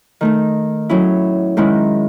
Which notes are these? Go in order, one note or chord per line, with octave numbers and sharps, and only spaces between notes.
D#3 A3 D#4
A2 F#3 C#4 E4
G#2 D#3 G#3 C#4 E4